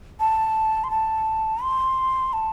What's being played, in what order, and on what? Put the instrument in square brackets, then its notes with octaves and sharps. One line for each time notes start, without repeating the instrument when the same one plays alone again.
[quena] A5
C6
A5
C6
A5